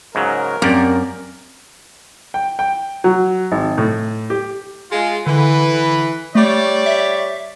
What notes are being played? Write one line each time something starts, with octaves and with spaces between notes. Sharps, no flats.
G#2 C#3 F#3 A#4
F#2 A#3 C4 G4 D5
G5
G5
F#3
G#1
A2
G4
G#3 F4
D3 E3 B4
G3 A3 C#5 D5
E5